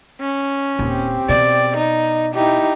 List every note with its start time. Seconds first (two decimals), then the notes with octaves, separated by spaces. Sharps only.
0.21 C#4
0.79 D#1 C4 G4
1.29 B2 D5
1.77 D#4
2.34 D#4 E4 G4